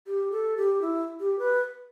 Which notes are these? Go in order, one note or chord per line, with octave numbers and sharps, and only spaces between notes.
G4
A4
G4
E4
G4
B4